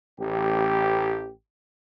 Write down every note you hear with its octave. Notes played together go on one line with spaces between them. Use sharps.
A1 G4